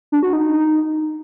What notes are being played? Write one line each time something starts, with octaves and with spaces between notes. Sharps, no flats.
D4
F#4
D#4